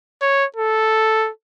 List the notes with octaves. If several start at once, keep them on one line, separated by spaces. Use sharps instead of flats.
C#5
A4